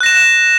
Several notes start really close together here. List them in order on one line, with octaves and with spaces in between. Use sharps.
F#6 A#6 E7